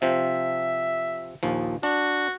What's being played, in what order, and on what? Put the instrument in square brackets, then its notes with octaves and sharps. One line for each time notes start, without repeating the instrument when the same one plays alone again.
[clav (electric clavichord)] C3 F3 C4 [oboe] E5
[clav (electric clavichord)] A#1 D#2 F3
[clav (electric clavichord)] D4 [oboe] F#4